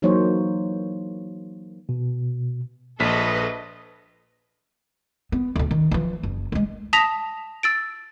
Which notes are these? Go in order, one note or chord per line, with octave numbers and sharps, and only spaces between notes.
E3 F#3 A#3 D#4 C5 C#5
B2
A#1 A4 B4 D#5 B6
B3
D2 D3
D#3
E3 F3
F#1
F#3 G#3
A5 D#6 A#6 B6 F7
E6 A6 D7